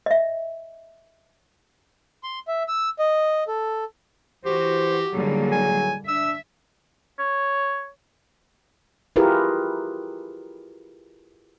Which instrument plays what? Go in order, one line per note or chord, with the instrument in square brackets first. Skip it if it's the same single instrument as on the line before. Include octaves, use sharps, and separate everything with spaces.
[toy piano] D#5 E5
[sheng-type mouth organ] C6
E5
E6
D#5
A4
[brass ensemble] E3 [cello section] F#4 [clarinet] G4 [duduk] C5
[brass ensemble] A2 D#3 G#4 [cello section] D3 G3 A#3 [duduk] F#3
[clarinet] G#5
[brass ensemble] D4 [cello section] E5 [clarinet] E6
[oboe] C#5
[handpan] E4 F4 G4 G#4 A#4 B4